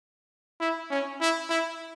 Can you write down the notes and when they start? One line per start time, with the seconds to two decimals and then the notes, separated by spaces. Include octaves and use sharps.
0.60 E4
0.90 C#4
1.21 E4
1.50 E4